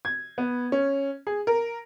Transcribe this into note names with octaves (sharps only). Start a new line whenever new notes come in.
G#6
B3
C#4
G#4
A#4